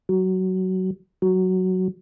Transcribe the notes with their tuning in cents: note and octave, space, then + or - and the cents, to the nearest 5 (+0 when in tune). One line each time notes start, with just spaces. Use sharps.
F#3 +15
F#3 +5